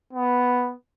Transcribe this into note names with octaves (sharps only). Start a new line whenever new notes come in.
B3